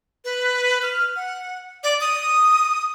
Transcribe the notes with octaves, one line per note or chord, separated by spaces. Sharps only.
B4
F6
F#5
D5
D#6